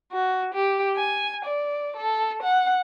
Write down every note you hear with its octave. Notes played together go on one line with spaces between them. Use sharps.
F#4
G4
G#5
D5
A4
F#5